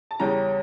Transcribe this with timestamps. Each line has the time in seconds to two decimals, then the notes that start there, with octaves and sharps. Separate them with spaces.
0.11 A5
0.20 E2 C#3 G3 C#4 A#5